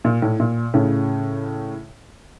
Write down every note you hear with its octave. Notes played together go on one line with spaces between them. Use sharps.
A#2
A2
A#2
A2 C#3